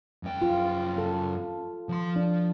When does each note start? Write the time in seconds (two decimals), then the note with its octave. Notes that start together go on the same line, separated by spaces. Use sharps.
0.23 F#2 G5
0.42 F4
0.98 A4
1.89 F3 C6
2.16 D4